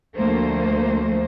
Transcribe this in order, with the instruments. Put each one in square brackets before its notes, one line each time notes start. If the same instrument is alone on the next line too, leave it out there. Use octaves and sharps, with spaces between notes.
[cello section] D2 F3 A3 A#3 C5